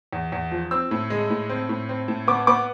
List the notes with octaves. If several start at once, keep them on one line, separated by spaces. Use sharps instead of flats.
E2
E2
F3
C4 E6
A2
G#3
A2
C4
A2
C4
A2
B3 D6
B3 D6